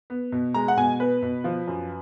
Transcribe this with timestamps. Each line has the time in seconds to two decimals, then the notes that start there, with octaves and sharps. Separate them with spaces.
0.10 B3
0.32 B2
0.54 G#3 A#5
0.68 F#5
0.77 B2 G#5
1.00 B3 B4
1.22 B2
1.44 F3
1.68 F#2